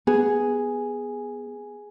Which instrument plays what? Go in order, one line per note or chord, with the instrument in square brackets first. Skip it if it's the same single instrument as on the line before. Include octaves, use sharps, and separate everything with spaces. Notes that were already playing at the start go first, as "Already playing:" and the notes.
[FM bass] B3 [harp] G#4